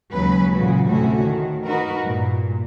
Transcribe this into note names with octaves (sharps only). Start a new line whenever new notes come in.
D#2 C#3 F#3 G#3 C#4 B4
A#2 C#3 E3 F#4
D2 A2 C3 A3 C#4 F#4
D#3
D#4 F#4 A#4 B4
G2 A#2